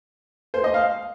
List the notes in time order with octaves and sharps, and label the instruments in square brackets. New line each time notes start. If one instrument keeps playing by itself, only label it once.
[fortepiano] C5
D#5
F5